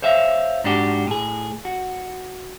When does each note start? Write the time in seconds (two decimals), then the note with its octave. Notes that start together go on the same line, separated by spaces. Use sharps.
0.02 C5 C#5 E5 F5
0.64 G#2 D4 F#4 G4
1.07 A2 G#4
1.65 F#4